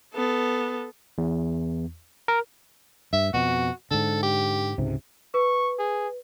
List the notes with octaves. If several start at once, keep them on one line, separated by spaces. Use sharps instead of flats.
B3 A4
E2
A#4
G2 E5
F2 B2 F#4
G#2 D3 A4
G4
C#2 G#2 C3
B4 C#6
G#4